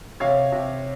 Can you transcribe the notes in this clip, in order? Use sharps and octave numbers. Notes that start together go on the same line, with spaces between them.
C3 C#5 F5
C3